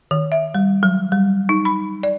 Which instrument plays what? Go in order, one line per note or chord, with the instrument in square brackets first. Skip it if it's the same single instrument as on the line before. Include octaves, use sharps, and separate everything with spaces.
[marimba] D#3
E5
G3
F#3
G3
D#4
B5
D5